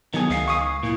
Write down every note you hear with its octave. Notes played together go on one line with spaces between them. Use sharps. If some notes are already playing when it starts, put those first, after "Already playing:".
D#3 F#3 B3 G#4
C#2 F5
F5 C#6 D#6
A#2 E4